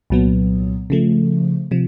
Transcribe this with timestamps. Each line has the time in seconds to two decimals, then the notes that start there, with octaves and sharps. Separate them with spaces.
0.10 C2 A#2 F#3 B3
0.90 C#3 F3 A3
1.71 C3 F3